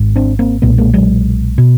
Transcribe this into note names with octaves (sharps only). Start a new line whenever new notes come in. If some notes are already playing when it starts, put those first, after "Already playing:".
Already playing: G#1 G#2
C4 D4
A#3 C4
B1 A#2 A3 B3
G#3 A#3
F#3 G#3
B2